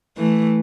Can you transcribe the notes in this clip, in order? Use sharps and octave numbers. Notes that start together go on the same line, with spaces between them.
E3 A3